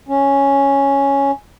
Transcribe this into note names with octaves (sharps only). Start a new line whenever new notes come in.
C#4